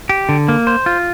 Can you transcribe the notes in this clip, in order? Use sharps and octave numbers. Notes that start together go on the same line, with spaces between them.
G4
D3
A#3
C5
F4